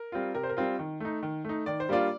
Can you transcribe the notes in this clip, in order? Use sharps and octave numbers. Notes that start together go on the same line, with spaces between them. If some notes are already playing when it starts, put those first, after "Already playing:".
Already playing: A#4
G3 C4 F4
C3 A#4
C5
A#4
G3 C4 F4
D#3
A3 D#4
D#3
A3 D#4
D#3 D5
C5
G3 A#3 D4 F4 D5